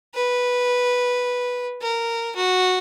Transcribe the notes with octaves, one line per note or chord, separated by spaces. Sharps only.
B4
A#4
F#4